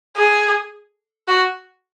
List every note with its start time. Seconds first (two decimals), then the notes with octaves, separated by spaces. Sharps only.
0.17 G#4
1.28 F#4